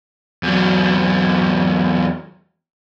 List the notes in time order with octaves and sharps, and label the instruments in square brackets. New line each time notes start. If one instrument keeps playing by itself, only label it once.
[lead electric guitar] E2 F#3